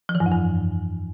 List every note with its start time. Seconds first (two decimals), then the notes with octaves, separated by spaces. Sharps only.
0.09 F3
0.15 E3
0.20 G2
0.26 F2
0.32 G2